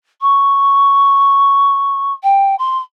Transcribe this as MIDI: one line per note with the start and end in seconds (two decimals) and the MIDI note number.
0.21 2.13 85
2.23 2.55 79
2.59 2.79 84